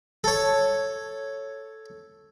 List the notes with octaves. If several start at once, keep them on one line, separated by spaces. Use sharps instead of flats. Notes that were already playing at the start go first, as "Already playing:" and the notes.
A4 C#5